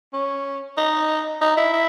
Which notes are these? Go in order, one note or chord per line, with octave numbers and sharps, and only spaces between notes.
C#4
D#4
D#4
E4
E4